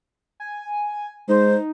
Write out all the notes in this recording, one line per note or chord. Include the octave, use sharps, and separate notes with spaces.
G#5
G#3 D#4 C5